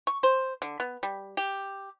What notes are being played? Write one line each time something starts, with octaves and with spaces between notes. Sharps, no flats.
C#6
C5
D3
B3
G3
G4